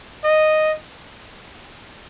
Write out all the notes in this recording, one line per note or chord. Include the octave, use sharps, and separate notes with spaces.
D#5